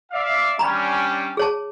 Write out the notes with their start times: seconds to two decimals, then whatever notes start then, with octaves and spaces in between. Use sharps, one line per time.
0.12 D5 E5 F5
0.59 G3 C#4 D4 A#5 B5
1.37 G#4 C#5 A5